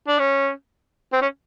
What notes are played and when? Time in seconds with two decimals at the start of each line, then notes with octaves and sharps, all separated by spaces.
0.07 D4
0.19 C#4
1.12 C4
1.22 C#4